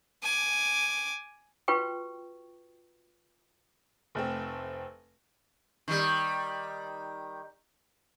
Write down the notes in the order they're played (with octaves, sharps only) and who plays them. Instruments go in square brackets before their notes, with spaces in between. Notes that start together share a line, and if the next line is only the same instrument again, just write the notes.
[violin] G#5 D6
[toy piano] F4 F#4 B4 G5 C#6
[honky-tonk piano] F1 A3 C4
[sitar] D#3 G3